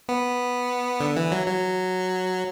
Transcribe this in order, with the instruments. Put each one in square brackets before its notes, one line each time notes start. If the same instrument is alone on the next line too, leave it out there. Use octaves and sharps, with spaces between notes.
[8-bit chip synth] B3
D3
E3
F#3
F#3